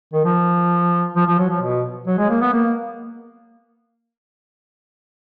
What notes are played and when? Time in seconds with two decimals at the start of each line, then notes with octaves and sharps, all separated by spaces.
0.13 D#3
0.24 F3
1.16 F3
1.27 F3
1.38 F#3
1.50 F3
1.61 B2
2.07 F#3
2.18 G#3
2.29 A#3
2.41 B3
2.53 A#3